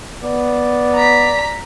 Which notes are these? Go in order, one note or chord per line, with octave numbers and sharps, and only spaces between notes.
B3 D5
A#5 B6